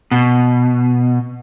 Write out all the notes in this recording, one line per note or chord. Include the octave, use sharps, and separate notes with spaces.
B2